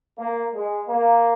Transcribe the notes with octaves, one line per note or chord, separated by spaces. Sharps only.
A#3
G#3
A#3